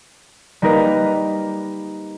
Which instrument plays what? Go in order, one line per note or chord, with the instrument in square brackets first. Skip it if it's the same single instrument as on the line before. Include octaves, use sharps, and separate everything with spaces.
[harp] G3 A#3 D#4 A#4 B4 D#5